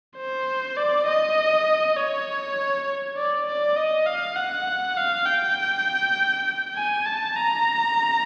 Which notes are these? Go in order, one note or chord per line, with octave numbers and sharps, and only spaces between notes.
C5
D5
D#5
C#5
D5
D5
D#5
F5
F#5
F5
G5
G#5
A5
A#5